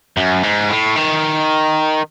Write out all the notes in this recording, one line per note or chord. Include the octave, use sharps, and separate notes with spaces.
F#2
G#2
A2
D#3